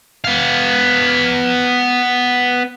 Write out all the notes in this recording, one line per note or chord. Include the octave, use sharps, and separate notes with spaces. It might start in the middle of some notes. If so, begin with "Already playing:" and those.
B3 F5